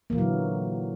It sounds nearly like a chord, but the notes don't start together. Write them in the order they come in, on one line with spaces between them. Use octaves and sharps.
A#3 E3 A#2 F#3 D3